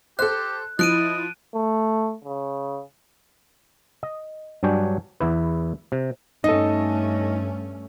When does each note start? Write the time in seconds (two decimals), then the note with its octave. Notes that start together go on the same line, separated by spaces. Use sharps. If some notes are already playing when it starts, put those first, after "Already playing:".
0.19 G4 A4 C5 F#6
0.79 F3 E4 D#5 F#6 D7 D#7
1.55 A3
2.25 C#3
4.03 D#5
4.63 G2 F#3 D4 C#5 G5 G#5
5.20 E2 E4 B4
5.92 C3
6.44 G2 A3 C#4 D#4 A4 D#5